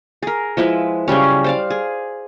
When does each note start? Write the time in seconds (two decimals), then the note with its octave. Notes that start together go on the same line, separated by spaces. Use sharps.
0.23 G#4 A#4
0.57 F3 G#3 E4 B4
1.08 C#3 F#3 G3 C#4
1.44 C5 D5 F5
1.70 G#4